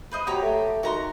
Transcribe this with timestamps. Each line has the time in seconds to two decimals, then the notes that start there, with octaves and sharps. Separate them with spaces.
0.11 B4 C5 D#5
0.27 F#4 G4 C#5 A#5
0.43 A3
0.83 D#3 F#4 A#5 C6